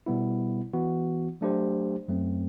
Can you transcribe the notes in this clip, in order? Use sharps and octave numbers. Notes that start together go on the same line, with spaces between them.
B2 G3 B3 E4
E3 B3 F#4
F#3 A3 D4 G4 C5
F#2 F#3 A3 C4